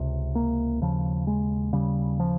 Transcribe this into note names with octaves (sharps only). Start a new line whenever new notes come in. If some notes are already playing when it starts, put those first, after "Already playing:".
Already playing: C#2 C3
A#3
D#2 C#3 F3
G#3
D#2 C#3 G3
F3